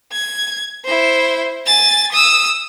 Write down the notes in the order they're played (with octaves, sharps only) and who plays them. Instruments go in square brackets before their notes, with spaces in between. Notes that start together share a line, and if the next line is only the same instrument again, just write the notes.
[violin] G#6
E4 C5
G#5 A6
D#6 E6